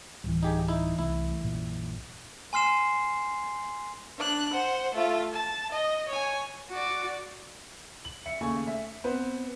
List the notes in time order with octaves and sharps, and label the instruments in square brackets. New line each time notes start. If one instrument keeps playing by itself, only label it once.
[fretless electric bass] D1 [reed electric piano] E3 G3
[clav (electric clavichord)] D#4 G4 G#4
D#4 E4
[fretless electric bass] C2 A3 [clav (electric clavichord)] E4
[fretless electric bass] A#1 F#2 A#2
[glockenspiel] G#5 C6 F6 C7 E7
[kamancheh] D4 F#6
C5 F#5
A3 F4
A5
D#5
C#5 G#5
[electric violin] F#4 D5
[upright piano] F#7
E5 C#7
D#2 C#3 A3 G#5 C#6
E5
B3 C4 B4 C5